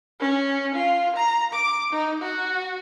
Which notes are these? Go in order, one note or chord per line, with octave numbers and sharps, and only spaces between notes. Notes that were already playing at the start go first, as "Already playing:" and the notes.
C#4
F4
A#5
D6
D#4
F#4